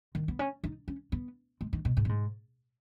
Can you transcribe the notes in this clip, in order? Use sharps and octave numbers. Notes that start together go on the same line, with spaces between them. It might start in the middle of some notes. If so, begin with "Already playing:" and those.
D#3
B3
C#4
D#4
C#4
B3
G#3
D#3
B2
G#2
B2
G#2